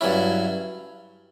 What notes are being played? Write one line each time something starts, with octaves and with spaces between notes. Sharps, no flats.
G2 F#3 C#4 E4